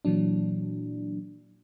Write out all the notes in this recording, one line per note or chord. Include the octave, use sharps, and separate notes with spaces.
A#2 E3 F#3 D4